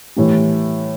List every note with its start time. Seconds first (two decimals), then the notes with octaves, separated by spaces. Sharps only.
0.16 A2 E3 G3